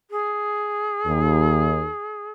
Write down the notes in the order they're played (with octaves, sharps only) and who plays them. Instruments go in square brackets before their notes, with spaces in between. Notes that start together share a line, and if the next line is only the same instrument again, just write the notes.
[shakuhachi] G#4
[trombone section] D#2